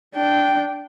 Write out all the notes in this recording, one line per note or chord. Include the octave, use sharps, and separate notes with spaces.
D4 G5